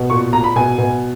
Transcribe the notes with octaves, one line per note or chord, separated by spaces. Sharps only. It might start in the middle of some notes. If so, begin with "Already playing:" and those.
Already playing: B2
A#2 C#6
A#2 A#5
B5
B2 G#5
B2